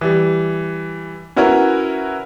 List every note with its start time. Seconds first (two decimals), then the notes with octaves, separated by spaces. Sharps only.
0.01 E3 G3
1.36 C#4 E4 F#4 A#4 B4 C#5